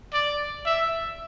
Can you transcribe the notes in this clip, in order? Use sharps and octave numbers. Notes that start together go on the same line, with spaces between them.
D5
E5